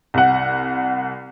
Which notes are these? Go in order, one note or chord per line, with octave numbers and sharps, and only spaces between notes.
C2 F#5